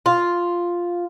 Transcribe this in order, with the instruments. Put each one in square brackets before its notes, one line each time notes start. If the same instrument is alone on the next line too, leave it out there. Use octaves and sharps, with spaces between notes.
[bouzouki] F4